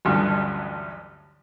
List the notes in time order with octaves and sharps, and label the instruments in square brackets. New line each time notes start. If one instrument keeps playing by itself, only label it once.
[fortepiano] A1 D2 G2 D3 F3 F#3